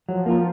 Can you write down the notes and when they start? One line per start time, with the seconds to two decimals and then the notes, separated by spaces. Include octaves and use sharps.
0.09 F3 F#3
0.26 A#3 F4 A#4